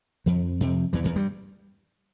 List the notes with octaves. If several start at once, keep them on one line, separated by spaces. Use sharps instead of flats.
F2 F3
F2 C3
E2 E3
E2 E3
G2 G3